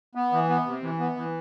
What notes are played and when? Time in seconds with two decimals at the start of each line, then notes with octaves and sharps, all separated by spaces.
0.15 B3
0.33 E3
0.49 B3
0.66 C3
0.83 E3
1.00 B3
1.17 E3